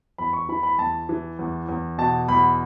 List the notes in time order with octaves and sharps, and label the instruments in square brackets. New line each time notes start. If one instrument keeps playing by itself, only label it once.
[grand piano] E2 B5
C#6
E3 B5
B5
E2 A5
E3
E2
E2
B2 A5
E2 B5